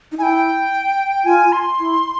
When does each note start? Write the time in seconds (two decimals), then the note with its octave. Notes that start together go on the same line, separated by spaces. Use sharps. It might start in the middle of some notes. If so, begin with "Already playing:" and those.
0.12 D#4
0.18 E4 G#5
0.23 G5
1.25 F4 G#5
1.52 C6
1.79 E4